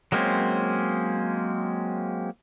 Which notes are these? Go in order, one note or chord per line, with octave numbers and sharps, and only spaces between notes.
F#3 G#3 A#3 C4 C#4